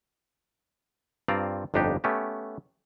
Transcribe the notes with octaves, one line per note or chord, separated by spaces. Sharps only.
G2 C4 F4 D5 A#5
G1 F2 D4 D#4 G4 B4
A3 B3 C#4 G4